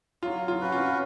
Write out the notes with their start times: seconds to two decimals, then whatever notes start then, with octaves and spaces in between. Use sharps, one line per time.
0.23 F#3 F4
0.48 F4
0.61 C#4 F#4 B4
0.72 F4